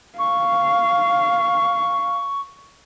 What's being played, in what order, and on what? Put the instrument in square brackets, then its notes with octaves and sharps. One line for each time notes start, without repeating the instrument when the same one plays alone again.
[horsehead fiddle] F5 [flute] C#6